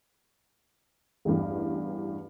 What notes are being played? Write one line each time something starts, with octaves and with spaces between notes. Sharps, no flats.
A1 E2 G2